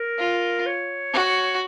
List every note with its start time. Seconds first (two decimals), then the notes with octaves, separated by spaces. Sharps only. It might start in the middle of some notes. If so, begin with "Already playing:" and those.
Already playing: A#4
0.19 F4
0.66 C#5
1.14 F#4